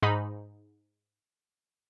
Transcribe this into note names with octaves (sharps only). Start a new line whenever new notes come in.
G#2 D#4 B5